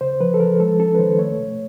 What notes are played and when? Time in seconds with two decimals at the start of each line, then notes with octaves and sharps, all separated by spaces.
0.01 C#3 C5
0.21 F3 B4
0.34 A4
0.40 F3 A#4
0.60 G#3 A4
0.79 C#4 A4
0.95 B4
0.99 D#3 C5
1.19 A3 C#5
1.38 B2